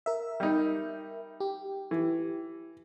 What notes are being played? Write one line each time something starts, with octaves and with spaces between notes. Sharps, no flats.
A#4 E5
G3 D#4
G4
E3